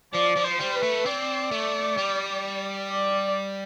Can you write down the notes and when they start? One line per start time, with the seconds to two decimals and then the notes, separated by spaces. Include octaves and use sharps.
0.13 F3 D5
0.37 F3
0.44 C5
0.59 G3
0.75 B4
0.83 A3
1.05 C4 D5
1.51 A3
1.98 G3
2.90 D5